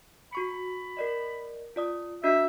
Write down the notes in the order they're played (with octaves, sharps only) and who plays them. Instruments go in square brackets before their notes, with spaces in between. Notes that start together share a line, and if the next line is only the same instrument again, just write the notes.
[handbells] F#4 C#6 C#7 [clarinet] B5
[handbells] A#4 D5 D#5
F4 D5 D#6
[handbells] D4 F#4 D#5 [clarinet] E5